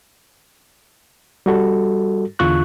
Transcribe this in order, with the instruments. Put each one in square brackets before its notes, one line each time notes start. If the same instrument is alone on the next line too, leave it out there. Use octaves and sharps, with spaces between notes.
[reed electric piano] G3 F#4 A4
E2 D3 F4 C#6 F#6